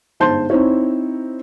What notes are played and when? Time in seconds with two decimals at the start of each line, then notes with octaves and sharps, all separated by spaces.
0.20 G1 G#2 C5 A5 C6 G6
0.50 C4 D#4 E4 C5 C#5